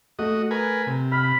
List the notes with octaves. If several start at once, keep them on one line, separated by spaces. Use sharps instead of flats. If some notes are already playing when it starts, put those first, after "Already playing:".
A3 F#4 D#5
A#4 B4 G#5
C3
B5 F6